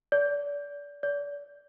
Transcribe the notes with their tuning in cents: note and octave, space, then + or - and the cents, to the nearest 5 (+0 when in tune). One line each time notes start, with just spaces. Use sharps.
D5 -30
D5 -35